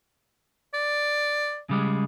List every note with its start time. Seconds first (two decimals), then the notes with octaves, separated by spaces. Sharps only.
0.74 D5
1.69 C#3 G3 G#3